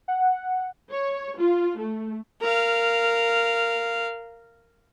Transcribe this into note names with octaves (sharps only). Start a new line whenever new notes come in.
F#5
C#5
F4
A3
A#4 F5